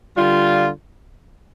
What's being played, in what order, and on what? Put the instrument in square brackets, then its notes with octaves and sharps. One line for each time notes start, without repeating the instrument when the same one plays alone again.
[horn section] D3 G3 F4